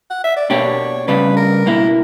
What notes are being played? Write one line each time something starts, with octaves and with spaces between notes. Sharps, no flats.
F#5
E5
D5
B2 A#3 D4 G4 C#5
C#3 G3 B3 D4 B4
A#4
B2 A#3 E4